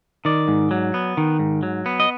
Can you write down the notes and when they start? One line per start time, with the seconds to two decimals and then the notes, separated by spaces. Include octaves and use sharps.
0.25 D#3 D5
0.48 G#2
0.71 F#3
0.94 B3
1.17 D#3
1.39 G#2
1.63 F#3
1.86 B3
2.00 D#5